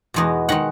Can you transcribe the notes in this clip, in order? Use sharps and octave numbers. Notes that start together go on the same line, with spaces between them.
E2 B2 G#3 B3
D#3 G#3 F#5